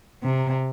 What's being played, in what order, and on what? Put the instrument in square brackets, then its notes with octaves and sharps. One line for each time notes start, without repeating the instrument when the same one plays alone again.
[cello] C3